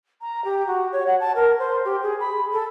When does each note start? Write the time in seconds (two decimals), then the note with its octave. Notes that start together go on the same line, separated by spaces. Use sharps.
0.21 A#5
0.44 G4
0.67 F#4
0.92 C#5
1.07 F#5
1.20 A5
1.35 A#4
1.59 C5
1.85 G4
2.02 G#4
2.20 B5
2.52 A4